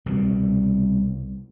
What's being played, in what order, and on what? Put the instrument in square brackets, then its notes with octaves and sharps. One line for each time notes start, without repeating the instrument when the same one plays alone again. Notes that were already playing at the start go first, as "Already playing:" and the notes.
[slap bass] C2 B2